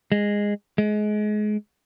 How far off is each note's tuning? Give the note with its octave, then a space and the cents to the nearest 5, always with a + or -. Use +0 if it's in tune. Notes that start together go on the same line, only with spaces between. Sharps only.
G#3 -15
G#3 +25